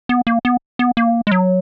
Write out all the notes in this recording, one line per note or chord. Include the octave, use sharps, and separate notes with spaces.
B3
A#3
B3
B3
A#3
G#3
F#3